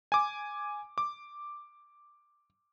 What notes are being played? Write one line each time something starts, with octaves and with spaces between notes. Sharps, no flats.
G#5 D6
D6